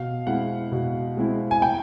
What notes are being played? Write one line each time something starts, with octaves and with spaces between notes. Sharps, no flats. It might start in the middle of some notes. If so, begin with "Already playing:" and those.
Already playing: B2 F5
G#3 C4 E4 F#5
B2
G#3 C4 E4
G#5
G5